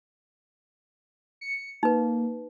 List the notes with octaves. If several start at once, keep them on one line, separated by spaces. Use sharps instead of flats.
C#7
A#3 D#4 B4